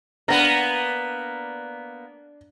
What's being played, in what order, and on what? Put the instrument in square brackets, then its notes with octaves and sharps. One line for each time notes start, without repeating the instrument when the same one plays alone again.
[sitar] A#3 B3 [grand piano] D4 A#5 A#6